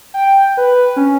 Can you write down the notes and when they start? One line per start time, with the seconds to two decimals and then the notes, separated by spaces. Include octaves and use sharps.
0.14 G5
0.57 B4
0.96 C#4